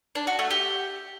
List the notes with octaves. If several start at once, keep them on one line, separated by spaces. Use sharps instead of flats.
D4
F#4
A3
G4